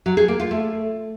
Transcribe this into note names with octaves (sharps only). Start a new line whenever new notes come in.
F#3
G#4
A#3
F4
A3